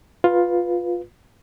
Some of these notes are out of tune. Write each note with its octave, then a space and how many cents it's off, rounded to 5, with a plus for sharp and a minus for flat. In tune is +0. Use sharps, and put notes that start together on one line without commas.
F4 +10 B4 +0